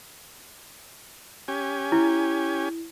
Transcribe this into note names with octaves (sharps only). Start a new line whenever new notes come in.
C#4 G4 G#5
E4